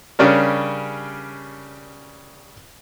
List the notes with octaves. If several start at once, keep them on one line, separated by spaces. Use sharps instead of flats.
C#3 G3 C#4 D4 A#4